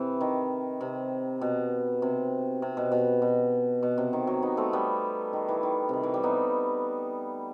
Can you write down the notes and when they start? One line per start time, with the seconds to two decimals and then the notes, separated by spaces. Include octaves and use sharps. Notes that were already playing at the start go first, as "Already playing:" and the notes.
Already playing: C3 E3
0.21 D#3
0.81 C3
1.41 B2
2.02 C3
2.62 C3
2.77 B2
2.92 B2
3.22 B2
3.83 B2
3.98 C3
4.13 D#3
4.27 F#3
4.42 B3 D#4
4.57 A3 C4
4.73 G3 B3
5.33 D#3
5.48 E3
5.63 D#3
5.89 C3 D#3
6.03 E3
6.14 G3
6.23 B3 D#4